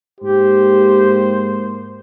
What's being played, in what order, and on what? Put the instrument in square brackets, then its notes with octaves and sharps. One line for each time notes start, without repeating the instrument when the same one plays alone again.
[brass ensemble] G#2 A#3 C5 [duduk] G4